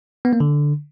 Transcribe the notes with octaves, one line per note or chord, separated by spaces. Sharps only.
B3
A#3
D3